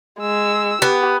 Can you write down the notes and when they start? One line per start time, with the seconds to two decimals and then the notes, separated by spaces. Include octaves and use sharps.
0.20 G#3 E6
0.82 B3 G4